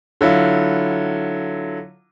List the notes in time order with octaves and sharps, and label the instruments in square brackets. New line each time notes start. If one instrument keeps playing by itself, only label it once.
[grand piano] D3 F#3 E4 F4